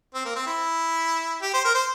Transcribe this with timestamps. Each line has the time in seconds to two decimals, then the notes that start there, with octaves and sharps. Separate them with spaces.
0.15 C4
0.25 A#3
0.36 C4
0.47 E4
1.42 G4
1.53 C5
1.65 A#4
1.75 C5